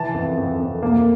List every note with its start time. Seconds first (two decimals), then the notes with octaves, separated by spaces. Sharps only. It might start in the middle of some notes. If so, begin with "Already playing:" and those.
Already playing: E3 A5
0.14 F2
0.37 F2
0.60 F2
0.83 A#3